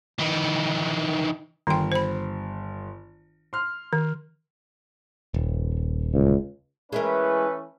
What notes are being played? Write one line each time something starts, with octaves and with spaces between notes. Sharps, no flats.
D#3 E3
G1 D#3 G5 C6
C5 B5
C6 F6
D#3
D#1
C#2
E3 G#3 A3 C#4 E4 A#4 B4